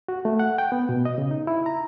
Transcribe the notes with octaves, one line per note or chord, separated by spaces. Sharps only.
F#4
A3
F#5
G5
B3
B2
D#5
C#3
D#4
E4
A#5